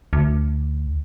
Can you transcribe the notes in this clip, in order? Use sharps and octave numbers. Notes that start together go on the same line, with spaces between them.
D2